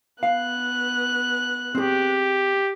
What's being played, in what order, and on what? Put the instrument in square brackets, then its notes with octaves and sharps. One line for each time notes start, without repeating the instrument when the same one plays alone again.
[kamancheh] B3 F#6 [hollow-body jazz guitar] F5
[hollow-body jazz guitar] C4 G#4 [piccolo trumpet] G4